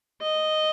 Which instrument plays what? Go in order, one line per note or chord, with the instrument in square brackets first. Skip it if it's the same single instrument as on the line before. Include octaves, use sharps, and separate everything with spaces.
[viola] D#5